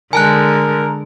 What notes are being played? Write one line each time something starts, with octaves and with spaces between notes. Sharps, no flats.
D3 G#3 A#4 G#5 A5 F#6